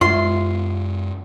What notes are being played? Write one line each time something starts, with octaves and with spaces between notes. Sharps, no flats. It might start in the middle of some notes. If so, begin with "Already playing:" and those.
F#2 G#3 F4 E5 C6